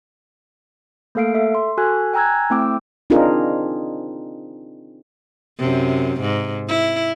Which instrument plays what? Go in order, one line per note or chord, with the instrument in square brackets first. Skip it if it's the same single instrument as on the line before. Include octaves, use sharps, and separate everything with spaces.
[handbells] A3 A#3 A4 F5 C7 D7
A4 E5
C6
F#4 A4 G#5 F#6
G5 G#5 A#5 E6 F#6 G#6
A3 C4 E4 G5 D6 E6
[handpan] C4 D4 D#4 F4 G#4 A#4
[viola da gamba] F#2 C3
G#2
E4